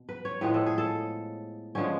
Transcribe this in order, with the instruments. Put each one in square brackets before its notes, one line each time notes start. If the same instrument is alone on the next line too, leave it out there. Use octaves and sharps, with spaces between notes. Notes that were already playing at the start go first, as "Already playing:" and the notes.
Already playing: [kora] B2
B4
C#5
A2 F3 G#3 B3 B4
A4
G#4
A4
D3 F3 G#3 B3 C#4